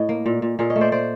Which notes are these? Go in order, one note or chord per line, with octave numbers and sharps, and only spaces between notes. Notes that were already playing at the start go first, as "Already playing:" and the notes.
Already playing: A2 D#5
A#3
A#2
A#2
A#2 G#4 A#4
C#5 D#5
A3
C5 D5
C5 D5